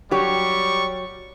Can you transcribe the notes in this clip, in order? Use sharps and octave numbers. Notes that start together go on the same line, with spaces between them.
F#3 G3 G4 C#5 C#6